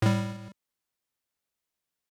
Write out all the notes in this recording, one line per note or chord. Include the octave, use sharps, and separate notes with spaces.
A2 G3